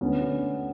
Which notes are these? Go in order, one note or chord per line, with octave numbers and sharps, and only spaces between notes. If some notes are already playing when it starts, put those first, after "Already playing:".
D2 B3 C#4
D3